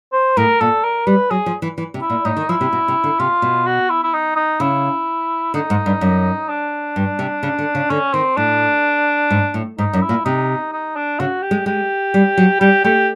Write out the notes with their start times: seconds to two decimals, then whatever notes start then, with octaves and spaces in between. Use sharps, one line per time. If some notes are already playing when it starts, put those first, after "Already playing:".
0.13 C5
0.37 A2 A#4
0.61 A#2 A4
0.84 A#4
1.07 G3 B4
1.31 F#3 G#4
1.46 F3
1.62 E3
1.78 E3
1.94 C3
2.01 E4
2.10 A#2
2.25 A2 D#4
2.37 D#3
2.49 F3 E4
2.61 C3
2.73 B2
2.88 C3
3.04 D3
3.19 C3 F4
3.42 B2
3.66 F#4
3.90 E4
4.04 E4
4.14 D#4
4.36 D#4
4.60 C#3 E4
5.54 D3 D#4
5.70 G#2
5.86 G2
6.01 F#2
6.49 D4
6.96 G2
7.19 C3
7.43 C#3
7.59 D3
7.75 C#3
7.90 D3 C#4
8.14 D#3 C4
8.37 A2 D4
9.31 G#2
9.54 A2
9.78 G#2 D#4
9.93 F#2
10.02 E4
10.09 A#2
10.25 C3 D#4
10.72 D#4
10.96 D4
11.19 C#3 F#4
11.43 G4
11.51 G#3
11.66 G#3 G4
12.14 G3
12.37 F#3
12.60 G3 G4
12.84 A3 G4